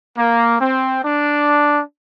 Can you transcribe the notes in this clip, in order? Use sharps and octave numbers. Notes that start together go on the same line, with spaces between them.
A#3
C4
D4